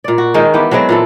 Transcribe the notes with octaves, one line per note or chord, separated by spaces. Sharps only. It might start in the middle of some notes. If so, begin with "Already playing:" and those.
A#2 D5
F#4
D#3 G#3 D#4 C5
E3 B3 G4
F#3 G#3 B3 C4
A#2 E3 A4